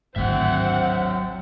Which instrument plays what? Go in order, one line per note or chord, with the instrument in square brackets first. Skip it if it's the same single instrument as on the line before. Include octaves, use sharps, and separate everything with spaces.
[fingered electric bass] G#1 D2 A2 [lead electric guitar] F#3 E5 [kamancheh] C4 F#5